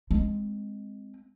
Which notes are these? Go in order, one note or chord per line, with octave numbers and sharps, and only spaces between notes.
G#3 C4